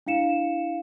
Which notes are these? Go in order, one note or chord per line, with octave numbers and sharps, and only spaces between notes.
D4 E4 F5 C#7 E7